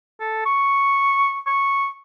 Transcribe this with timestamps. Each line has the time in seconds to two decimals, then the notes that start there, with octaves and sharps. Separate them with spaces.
0.20 A4
0.46 C#6
1.47 C#6